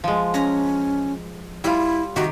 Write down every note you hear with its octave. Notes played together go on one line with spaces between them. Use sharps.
F3 G#3
C#4 A#5
G3 E4 F4
C3 D#3 F#4 G4